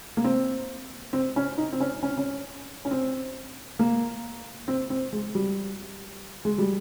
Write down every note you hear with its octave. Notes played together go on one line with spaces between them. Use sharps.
A#3
C4
C4
C#4
D#4
C4
C#4
C#4
C4
C#4
C#4
C4
A#3
C4
C4
G#3
G3
G#3
G3